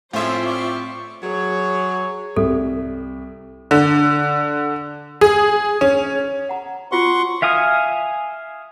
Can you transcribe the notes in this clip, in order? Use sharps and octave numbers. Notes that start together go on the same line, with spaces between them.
A2 F3 C4 F4 G#4 C5 C#5 E5
D5 C#6 D6
F#3 G#4 C#5
C2 A4
D3
G#4
C#4
F#5 A#5
F4 F#4 C#5 F#5 C6 C#6
E5 F5 G#5 D#6